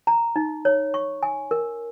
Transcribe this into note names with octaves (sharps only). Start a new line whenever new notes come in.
A#5
D#4
C#5
C#6
G#5
A#4